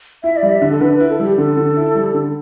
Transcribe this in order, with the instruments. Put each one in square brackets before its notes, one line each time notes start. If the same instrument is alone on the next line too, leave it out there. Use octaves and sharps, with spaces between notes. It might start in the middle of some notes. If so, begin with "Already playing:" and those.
[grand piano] E4 [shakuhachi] E5
[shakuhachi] D5
[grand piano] G3
[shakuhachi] E5
[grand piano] D3
[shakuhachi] A4
[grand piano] D3 [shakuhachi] B4
[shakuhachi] B4
[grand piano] E4
[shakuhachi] A4
[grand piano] G3 [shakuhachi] G4
[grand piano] D3 [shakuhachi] A4
[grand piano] D3
E4
G3
D3